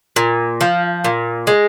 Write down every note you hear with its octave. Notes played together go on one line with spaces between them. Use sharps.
A#2
F3
A#2
G#3